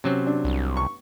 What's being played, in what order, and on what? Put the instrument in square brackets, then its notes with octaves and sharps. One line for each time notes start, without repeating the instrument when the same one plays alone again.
[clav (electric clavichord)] C3 F#3 C4 [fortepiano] C#4
[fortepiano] D4
[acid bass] C2
[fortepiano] C#6